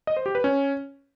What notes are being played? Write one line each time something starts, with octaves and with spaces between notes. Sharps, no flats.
D#5
C5
G4
B4
C#4